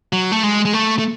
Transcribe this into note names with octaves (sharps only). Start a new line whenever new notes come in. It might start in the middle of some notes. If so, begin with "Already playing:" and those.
F#3
A3
G#3
G#3
A3
A3